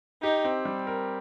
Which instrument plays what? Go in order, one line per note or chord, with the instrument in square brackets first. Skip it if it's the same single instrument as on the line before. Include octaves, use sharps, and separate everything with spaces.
[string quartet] D#4 [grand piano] G4
[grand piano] C4
G3
A#4